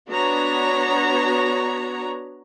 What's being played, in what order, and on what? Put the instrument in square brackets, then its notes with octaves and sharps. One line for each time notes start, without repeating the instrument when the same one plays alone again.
[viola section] B3 D4 F#4 C#5 A#5